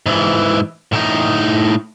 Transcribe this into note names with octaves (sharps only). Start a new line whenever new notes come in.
G#2 E3
A2 D#4